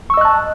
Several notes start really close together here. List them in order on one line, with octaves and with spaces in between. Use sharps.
C#6 E6 D#5 F#6 A5